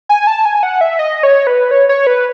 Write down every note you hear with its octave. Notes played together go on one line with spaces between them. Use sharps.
G#5
A5
G#5
F#5
E5
D#5
C#5
B4
C#5
C#5
B4